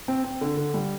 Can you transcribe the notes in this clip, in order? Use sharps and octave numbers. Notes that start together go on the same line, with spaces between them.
C4
C4
D3
D3
G3